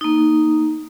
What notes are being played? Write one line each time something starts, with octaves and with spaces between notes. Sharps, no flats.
A#3 D#4